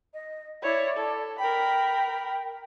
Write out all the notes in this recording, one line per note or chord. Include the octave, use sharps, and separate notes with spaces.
D#5
E4 C#5 D5
A4
A#4 G5 B5